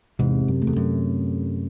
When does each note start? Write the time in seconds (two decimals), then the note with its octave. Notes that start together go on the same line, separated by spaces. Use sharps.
0.19 E2 G#2 C3
0.48 F#2
0.62 A3
0.67 E2
0.76 F#2